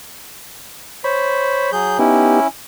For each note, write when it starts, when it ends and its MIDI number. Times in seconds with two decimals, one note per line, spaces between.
1.04 1.70 72
1.04 1.72 73
1.04 1.72 83
1.72 1.98 54
1.72 1.98 68
1.72 1.98 91
1.99 2.40 59
1.99 2.47 61
1.99 2.40 63
1.99 2.47 64
1.99 2.40 67